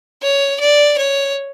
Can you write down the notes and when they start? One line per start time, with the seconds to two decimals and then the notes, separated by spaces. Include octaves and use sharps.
0.22 C#5
0.60 D5
0.98 C#5